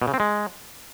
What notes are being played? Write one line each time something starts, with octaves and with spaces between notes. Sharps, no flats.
B2
C#3
C4
G#3